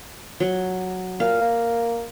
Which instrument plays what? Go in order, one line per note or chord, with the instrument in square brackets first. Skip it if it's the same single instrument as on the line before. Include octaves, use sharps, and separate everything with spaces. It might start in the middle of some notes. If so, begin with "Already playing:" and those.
[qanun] F#3
[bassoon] A#2 [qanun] F5
[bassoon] A#3